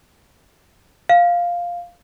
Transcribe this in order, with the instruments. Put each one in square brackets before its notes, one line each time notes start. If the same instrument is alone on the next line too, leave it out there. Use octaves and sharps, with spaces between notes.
[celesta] F5